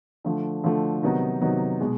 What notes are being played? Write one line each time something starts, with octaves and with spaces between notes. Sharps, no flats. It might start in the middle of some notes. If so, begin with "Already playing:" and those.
D3 F3 A3
D3 F3 A3
C3 D#3 F#3 B3 D#4
C3 D#3 F#3 B3 D#4
B2 G#3